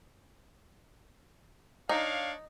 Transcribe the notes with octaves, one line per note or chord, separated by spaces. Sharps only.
D4 D#4 C#5 F5